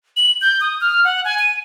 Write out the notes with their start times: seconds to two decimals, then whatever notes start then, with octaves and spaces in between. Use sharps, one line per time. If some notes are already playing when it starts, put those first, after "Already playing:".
0.16 F#7
0.41 G6
0.61 D#6
0.81 F6
1.04 F#5
1.25 G#5
1.39 D#7